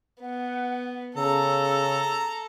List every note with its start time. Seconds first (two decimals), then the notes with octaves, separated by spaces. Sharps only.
0.21 B3 F#5
1.17 C#3 A4 A#5 E6